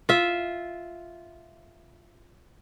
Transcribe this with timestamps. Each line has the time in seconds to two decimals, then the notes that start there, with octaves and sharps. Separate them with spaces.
0.09 F4 E5